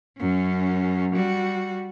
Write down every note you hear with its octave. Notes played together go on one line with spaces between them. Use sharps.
F#2 C#4
G3 F#4